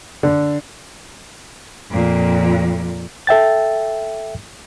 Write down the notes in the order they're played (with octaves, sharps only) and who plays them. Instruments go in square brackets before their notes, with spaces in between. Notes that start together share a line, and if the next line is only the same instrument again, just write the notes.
[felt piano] D3
[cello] F2 A#2
[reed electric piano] A4 E5 G5 A6